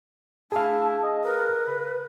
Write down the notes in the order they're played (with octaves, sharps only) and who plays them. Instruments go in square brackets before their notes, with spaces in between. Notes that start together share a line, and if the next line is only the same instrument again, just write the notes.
[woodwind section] A3 D4 E4 [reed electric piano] G#4 F5 [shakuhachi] A5
[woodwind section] D#5
[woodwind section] A#4 [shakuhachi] B4
[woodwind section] C#3 A#4 B5